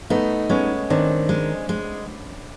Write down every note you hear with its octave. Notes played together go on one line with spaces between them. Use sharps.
A3 B3 D#4
G#3 B3 C#4
D#3 C4 D4
G#3
G#3